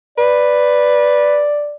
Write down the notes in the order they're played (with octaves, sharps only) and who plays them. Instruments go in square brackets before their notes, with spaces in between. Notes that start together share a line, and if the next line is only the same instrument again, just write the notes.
[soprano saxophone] B4 [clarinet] D5